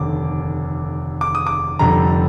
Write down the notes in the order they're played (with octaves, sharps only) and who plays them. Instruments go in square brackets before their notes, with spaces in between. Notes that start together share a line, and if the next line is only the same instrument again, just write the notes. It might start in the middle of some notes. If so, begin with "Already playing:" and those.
Already playing: [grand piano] F1 D#2 D3 D6
D6
D#6
D6
F1 F2 D3 G3 A#5